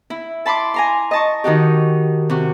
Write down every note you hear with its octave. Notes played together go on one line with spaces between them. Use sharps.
E4
A5 B5 C6 D6
G#5 A#5 C6
D#5 A5 C#6
D#3 D#4 F#4 G4
C3 F#4